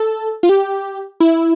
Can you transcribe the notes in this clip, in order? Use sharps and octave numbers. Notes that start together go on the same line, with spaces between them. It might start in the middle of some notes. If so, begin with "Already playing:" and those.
Already playing: A4
F4
G4
E4